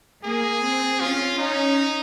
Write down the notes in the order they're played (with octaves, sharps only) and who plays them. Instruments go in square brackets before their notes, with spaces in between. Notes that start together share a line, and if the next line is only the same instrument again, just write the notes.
[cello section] A#3 [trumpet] G#4
[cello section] C4
[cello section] C#4 [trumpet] F4
[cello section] C#4 [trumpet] D#4